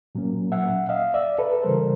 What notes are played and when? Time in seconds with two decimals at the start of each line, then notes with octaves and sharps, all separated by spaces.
0.15 A#2 F#3 A#3 C#4
0.52 E5 F#5
0.89 D#5 F5
1.14 D5 E5
1.39 A4 B4
1.63 C#3 E3 G3 A#4 C5